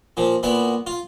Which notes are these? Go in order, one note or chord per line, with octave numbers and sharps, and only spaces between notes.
A#2 F3
A#2 B3 E4 B5
F4